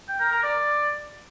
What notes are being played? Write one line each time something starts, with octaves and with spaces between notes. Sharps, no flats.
G5
A#4
A#4
D5